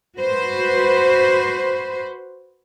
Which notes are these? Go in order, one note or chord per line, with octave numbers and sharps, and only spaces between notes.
F#4 B4 C5